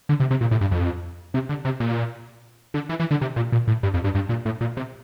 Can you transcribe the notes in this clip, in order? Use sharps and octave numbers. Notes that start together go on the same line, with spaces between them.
D3
C3
C3
A#2
A2
G2
F2
C3
D3
C3
A#2
D3
E3
E3
D3
C3
A#2
A#2
A2
G2
F2
G2
G2
A#2
A2
A#2
C3